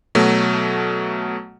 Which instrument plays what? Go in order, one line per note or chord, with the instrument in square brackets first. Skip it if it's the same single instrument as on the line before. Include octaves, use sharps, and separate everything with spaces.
[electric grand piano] B2 F#3 A3